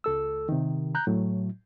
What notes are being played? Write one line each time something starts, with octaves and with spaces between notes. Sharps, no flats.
C#2 A4 E6
C3 D#3
A#5 F#6 G6
A2 F#3